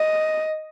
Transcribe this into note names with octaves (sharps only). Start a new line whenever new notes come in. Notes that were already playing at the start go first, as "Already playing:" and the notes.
Already playing: D#5